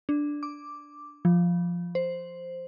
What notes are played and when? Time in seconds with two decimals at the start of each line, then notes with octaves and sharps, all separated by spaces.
0.09 D4
0.43 D6
1.25 F3
1.95 C5